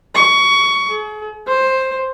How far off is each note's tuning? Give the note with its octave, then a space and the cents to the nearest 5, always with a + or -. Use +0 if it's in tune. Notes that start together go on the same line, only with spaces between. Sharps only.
C#6 +20
G#4 +45
C5 +10